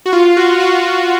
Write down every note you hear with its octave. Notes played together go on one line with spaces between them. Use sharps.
F#4
F4
F#4
F#4
F4